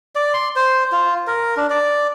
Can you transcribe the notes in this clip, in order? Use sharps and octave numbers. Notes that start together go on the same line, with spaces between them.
D5
C6
C5
F4
A#4
D4
D5